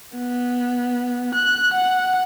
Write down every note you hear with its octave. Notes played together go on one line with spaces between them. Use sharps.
B3
F#6
F#5